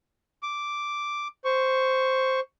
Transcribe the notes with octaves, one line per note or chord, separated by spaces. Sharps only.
D6
C5 C#6